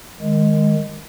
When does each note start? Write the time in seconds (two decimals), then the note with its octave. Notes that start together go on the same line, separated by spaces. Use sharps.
0.21 D#3 G#3